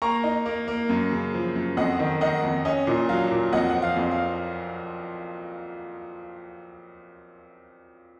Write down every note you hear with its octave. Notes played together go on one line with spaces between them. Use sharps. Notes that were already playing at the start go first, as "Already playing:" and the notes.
A#3 A#5 C#6
D#4
A#3
A#3
F#2
C#3
F3
F#2
F2 D#5 F#5
D#3
D#3 D#5 F#5
F2
C#4 D#5
A#2
F#3 F5
A#2
F2 D#5 F#5
F#5
F3
F5
F2
F5